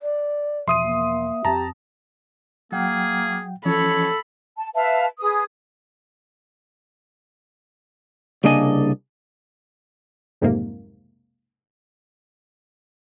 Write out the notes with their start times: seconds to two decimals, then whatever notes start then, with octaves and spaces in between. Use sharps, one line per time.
0.02 D5
0.68 E2 B2 F3 E5 C6 D#6 D#7
0.83 A#3
1.45 F2 A#3 C4 G4 A5 A#5
2.72 F#3 A#3 G#4 F#5 G5
3.65 E3 F3 C#4 A4 C#5 B5
4.57 A5
4.74 B4 E5 F5 A5
5.19 G#4 B4 D#6
8.44 C2 C#3 A#3 D4 D#5 G#5
10.41 B1 F2 G#2 C3 A#3